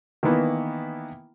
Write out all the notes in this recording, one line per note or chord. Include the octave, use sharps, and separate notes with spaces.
D#3 E3 A#3 B3 E4